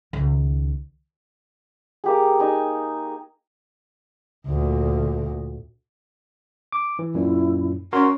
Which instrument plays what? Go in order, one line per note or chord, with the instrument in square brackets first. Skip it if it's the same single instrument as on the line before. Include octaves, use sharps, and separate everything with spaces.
[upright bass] C#2 D#3
[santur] A#3 G4 G#4
D#4 G#5
[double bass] D2 A#2
[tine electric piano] D6
E3
[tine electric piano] F#2 A#2 [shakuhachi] E4
[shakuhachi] C#4 [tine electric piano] F#4 A#4 C6